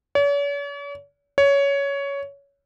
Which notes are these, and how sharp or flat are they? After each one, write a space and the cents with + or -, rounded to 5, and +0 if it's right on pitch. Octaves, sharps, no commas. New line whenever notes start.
C#5 +45
C#5 +15